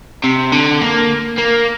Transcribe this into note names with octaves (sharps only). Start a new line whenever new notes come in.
C3
D3
A#3
A#3